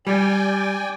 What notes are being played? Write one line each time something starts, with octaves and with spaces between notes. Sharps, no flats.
G3 D5 G5 G#5